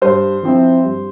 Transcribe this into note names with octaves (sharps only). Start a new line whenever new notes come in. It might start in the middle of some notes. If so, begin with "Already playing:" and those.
G2 C5
F3 C4 E4
G2